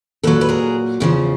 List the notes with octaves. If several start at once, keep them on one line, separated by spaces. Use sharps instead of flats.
A#2 F#3 A4 B4
B4
G#4 A#4
E2 C#3 F3